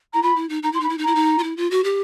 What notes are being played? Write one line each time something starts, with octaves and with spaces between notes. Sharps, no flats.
E4 A#5
F4 B5
E4
D#4
D#4 A#5
E4 C6
D#4 B5
E4
D#4
E4 A#5
D#4
F4
E4
F4
F#4
G4